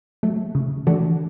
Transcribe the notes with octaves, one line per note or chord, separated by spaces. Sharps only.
F#3 A3
C#3
E3 A3 D4 F#4